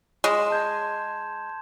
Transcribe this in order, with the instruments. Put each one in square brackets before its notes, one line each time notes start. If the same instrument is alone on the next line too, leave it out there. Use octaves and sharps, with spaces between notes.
[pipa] G#3 [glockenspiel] C6 E7
[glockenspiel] A5 G6 G#6